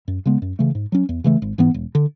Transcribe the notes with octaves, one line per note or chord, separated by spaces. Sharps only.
F#2
C#3 G#3 B3
F#2
C#3 E3 A3
G#2
F#3 C#4
E2
C#3 E3 A3
G#1
G#2 E3 B3
E1
D3